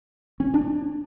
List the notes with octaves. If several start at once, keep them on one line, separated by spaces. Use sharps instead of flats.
C#4
D4